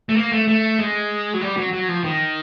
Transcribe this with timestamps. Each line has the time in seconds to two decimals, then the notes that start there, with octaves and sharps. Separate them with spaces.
0.09 A3
0.16 A#3
0.32 A3
0.48 A3
0.79 G#3
1.34 F#3
1.41 G3
1.57 F#3
1.73 F#3
1.88 F3
2.04 D#3